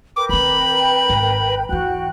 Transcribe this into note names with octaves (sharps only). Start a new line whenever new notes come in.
A#4 B4 G5 D6
D#3 C4 B5
G#1
E2 E3 F#4 G5 F#6